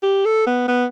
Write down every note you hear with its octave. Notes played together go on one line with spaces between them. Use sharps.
G4
A4
B3
B3